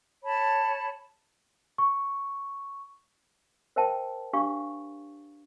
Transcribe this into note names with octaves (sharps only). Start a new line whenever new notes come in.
C#5 A5 B5
C#6
A#4 C5 E5 G5 A5
D4 G4 F5 C#6